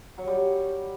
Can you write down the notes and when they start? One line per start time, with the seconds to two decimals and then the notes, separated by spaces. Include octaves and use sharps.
0.18 F#3
0.27 G3